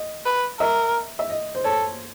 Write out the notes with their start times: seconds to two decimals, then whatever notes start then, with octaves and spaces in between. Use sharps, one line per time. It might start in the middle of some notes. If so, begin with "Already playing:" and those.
Already playing: D#5
0.26 B4
0.60 A#4 E5
1.19 E5
1.30 D#5
1.55 C5
1.64 A4 C#5